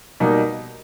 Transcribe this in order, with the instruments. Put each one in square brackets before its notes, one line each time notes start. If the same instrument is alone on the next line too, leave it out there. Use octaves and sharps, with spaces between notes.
[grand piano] B2 G3 A#3 D#4